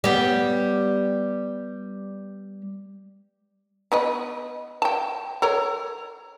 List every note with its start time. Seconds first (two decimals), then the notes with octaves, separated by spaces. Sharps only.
0.04 G3 B3
3.92 B3 B4 D#5
4.82 G5 A5
5.42 A4 A#4 C#5